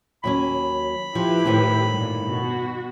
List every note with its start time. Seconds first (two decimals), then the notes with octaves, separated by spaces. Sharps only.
0.24 D#2 F#3 C#4 B5
1.15 F3 E4 G4 B4
1.45 A2 D#3 C4
1.90 G2 A#2
2.27 B2 F#4